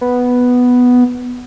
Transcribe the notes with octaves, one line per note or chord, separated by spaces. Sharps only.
B3